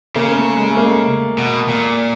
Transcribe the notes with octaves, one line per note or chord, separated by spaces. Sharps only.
C#3 A#3
A#3
A3
G#3
A3
A#3
B2
A#2